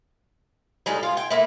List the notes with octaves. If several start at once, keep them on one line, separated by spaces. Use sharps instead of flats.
A2 G3 G#3 D#4
F4
G5 G#5
A3 A#3 E4